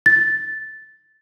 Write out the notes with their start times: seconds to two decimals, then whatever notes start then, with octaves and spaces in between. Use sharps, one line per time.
0.06 A6